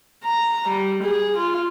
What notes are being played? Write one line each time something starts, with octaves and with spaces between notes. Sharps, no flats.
A#5
G3
G#4
F4